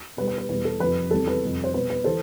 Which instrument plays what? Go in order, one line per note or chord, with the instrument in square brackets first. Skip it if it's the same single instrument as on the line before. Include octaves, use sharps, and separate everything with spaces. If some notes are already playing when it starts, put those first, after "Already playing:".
[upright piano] B2 G3 B4
B4
B4
E2 B2 G3 B4
A4
F2 C3 F3 B4
E2 C3 G3 A4
B4
F2 C3 G3
C5
B2 G3 B4
B4
E3 A4 C5